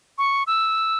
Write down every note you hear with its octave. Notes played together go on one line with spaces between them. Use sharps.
C#6
E6